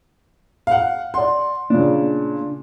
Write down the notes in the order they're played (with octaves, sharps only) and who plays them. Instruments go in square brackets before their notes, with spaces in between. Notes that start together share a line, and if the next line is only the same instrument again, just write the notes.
[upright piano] F5 F#5
[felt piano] D5 F#5 [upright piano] C6
[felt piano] A#2 C#3 [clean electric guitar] D4